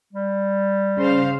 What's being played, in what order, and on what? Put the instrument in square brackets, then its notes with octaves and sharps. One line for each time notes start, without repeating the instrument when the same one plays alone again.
[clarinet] G3
[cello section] C#3 C5 F5